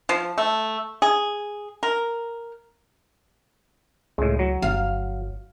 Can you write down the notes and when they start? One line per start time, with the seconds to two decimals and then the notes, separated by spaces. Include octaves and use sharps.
0.09 F3
0.38 A3
1.02 G#4
1.83 A#4
4.18 C#2 A2 G#3
4.39 F#3
4.62 G1 F5